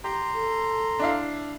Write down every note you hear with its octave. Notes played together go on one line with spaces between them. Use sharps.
G4 A#5 C6
A4
D4 E4 F5